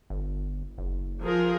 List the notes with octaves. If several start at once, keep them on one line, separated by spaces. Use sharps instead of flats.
G1
F#1
F3 G#4 A#4